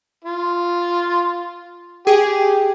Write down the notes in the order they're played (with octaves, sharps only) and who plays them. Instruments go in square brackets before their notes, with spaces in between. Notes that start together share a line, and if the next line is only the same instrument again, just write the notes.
[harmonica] F4
[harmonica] G4 [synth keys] G#4